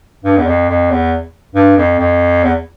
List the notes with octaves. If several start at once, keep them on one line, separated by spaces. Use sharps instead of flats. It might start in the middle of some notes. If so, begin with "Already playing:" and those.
G2
E2
F2
F2
E2
G2
F2
F2
E2